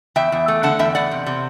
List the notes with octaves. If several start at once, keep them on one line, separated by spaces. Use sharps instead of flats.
E2 E5 G5
E2
A3
D3 F#5 A5
E2 E5 G5
E2 D5 F#5
C3
C3